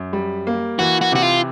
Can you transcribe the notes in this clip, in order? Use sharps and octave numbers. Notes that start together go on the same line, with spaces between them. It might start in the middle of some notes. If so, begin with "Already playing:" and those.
Already playing: F#2
G3
A#3
E3 F#4
F#4
C3 F#4
F4